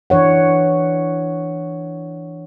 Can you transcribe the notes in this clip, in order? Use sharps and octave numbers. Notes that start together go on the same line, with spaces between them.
E3 D4 C#5 F#5